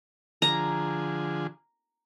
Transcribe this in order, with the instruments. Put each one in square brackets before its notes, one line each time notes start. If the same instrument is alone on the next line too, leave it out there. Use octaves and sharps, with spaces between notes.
[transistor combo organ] D3 F3 G#4 [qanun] A#5